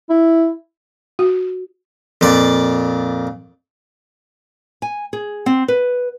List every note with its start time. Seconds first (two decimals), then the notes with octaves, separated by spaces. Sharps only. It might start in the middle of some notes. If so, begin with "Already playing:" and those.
0.10 E4
1.19 F#4
2.21 F2 A#2 D5 D6
4.82 G#5
5.13 G#4
5.46 C4
5.68 B4